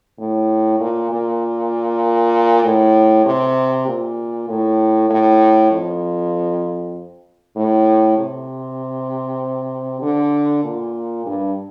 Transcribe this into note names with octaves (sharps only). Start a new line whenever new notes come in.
A2
A#2
A#2
A2
C3
A#2
A2
A2
F2
A2
C3
D3
A#2
G2